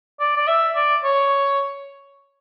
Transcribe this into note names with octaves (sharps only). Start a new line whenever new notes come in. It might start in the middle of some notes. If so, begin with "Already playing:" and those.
D5
D5
E5
D5
C#5